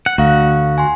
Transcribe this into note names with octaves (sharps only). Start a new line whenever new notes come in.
F#5
D2 A3 F#4 F5
G#5 C6